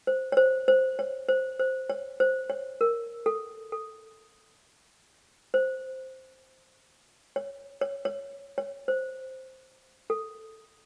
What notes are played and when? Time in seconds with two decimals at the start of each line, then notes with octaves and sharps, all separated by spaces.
0.07 C5
0.32 C#5
0.37 C5
0.68 C5
0.99 C#5
1.29 C5
1.59 C5
1.90 C#5
2.20 C5
2.50 C#5
2.81 A#4
3.26 A4
3.72 A4
5.54 C5
7.36 C#5
7.81 C#5
8.05 C#5
8.58 C#5
8.88 C5
10.10 A4